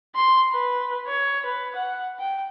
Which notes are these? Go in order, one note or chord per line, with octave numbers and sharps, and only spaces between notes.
C6
B4
C#5
B4
F#5
G5